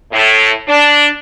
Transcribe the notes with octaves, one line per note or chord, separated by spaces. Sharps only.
A2
D4